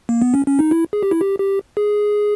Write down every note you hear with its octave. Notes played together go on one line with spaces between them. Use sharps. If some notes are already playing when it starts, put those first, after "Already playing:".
A#3
B3
C#4
C#4
D#4
E4
G#4
G4
E4
G4
G4
G#4